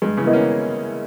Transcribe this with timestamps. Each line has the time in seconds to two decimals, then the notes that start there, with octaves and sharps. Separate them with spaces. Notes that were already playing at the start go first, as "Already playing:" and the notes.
0.02 G2 G#3
0.17 C#3 E3
0.25 B3 E4 A#4 D#5
0.33 A#3 C#4